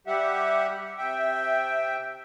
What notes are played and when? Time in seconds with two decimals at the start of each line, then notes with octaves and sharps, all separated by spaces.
0.07 G3 G4 E5 F#5
0.98 C3 E5 G5